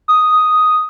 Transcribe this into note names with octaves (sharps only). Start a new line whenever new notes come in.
D#6